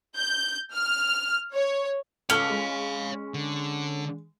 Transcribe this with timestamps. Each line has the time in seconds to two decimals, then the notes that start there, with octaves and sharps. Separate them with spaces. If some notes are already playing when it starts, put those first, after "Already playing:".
0.16 G6
0.73 F6
1.53 C#5
2.30 C#2 C#4 A4 C#5 F5 D6
2.50 G#3
3.34 D3